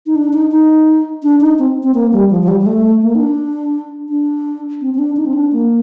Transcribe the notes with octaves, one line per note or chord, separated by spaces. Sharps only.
D#4
D4
D#4
D#4
D4
D#4
C4
C4
A#3
G3
F3
F3
G3
G3
A3
A#3
D#4
D4
D4
C4
C4
D4
D#4
C4
D4
A#3